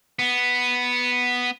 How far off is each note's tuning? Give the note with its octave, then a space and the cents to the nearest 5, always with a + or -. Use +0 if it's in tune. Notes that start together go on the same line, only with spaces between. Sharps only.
B3 +0